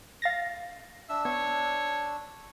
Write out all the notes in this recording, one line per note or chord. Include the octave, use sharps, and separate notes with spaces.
F5 A6 A#6
D4 E5 E6
B3 C#5